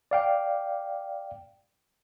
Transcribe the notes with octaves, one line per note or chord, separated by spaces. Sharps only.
D5 F5 G5